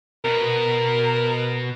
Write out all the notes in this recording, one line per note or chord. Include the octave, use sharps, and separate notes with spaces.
B2 A#4 B4